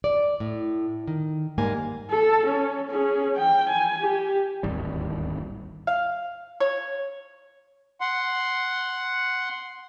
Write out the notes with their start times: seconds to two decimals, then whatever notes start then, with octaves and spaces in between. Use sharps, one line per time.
0.04 D5
0.40 A2
1.08 D#3
1.58 G#2 G3 A#3 G#5
2.10 A4
2.46 C#4
2.90 C#4 G#4
3.36 G5
3.70 G#5
4.01 G4
4.63 D1 G#1 D#2 G3
5.87 F5
6.60 C#5
8.01 F#5 C6